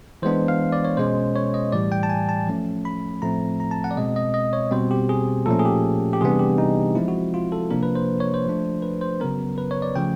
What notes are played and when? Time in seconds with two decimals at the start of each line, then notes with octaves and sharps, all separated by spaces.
0.22 E3 G#3 B3 D4 C5
0.48 F5
0.72 D5
0.85 C#5
0.97 B2 G#3 C#4 C5
1.36 C#5
1.54 D#5
1.72 A2 E3 G3 D5
1.92 G5
2.03 A5
2.09 G#5
2.29 A5
2.47 F3 A3 C#4
2.85 B5
3.22 A2 F3 A3 C4 A#5
3.60 A#5
3.71 A5
3.84 F#5
3.91 D5
3.96 B2 G#3 C4 D#5
4.16 D#5
4.34 D#5
4.53 C#5
4.71 B2 G3 C4 C5
4.91 G4
5.09 G#4
5.46 A#2 F3 A3 C#4 A4
5.59 G#4
5.65 G4
6.13 G4
6.21 C3 E3 G3 B3 D4 G#4
6.39 G4
6.58 D#4
6.95 F3 G#3 C4 E4
7.08 F#4
7.34 F4
7.52 A4
7.70 C3 F3 A#3 D4 A#4
7.83 B4
7.95 C5
8.20 C#5
8.34 C5
8.45 F3 A3 D4
8.82 B4
9.01 C5
9.20 C#3 F#3 B3 A#4
9.58 B4
9.71 C#5
9.82 D5
9.96 C#3 F3 A3 G5